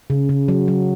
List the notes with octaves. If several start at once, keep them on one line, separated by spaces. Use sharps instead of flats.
C#3
C#3
F#3
F#3